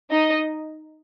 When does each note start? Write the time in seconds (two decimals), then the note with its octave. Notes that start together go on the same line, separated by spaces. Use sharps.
0.11 D#4 D#5